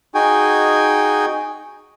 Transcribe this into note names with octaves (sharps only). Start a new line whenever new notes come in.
D#4 F#4 G#4 G5 G#5